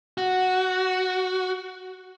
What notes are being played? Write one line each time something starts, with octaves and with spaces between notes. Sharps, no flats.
F#4